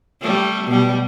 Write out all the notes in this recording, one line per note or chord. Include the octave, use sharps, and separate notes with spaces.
G3 A3
B2 G3